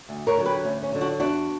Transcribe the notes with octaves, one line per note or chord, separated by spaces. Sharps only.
D2
A#4 C#5
D3 F#3
G4 B4
D2 C#4
C#4
D3 F#3
D4 F#4
E2 D4 F#4